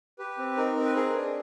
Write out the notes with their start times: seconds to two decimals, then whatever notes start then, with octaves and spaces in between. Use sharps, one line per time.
0.19 G4 B4
0.38 C4
0.57 D#4 A#4
0.76 C4
0.85 B4
0.96 G#4 A#4
1.15 D4